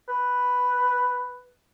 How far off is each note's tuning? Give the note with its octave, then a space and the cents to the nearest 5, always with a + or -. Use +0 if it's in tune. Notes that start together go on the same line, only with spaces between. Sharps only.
B4 +5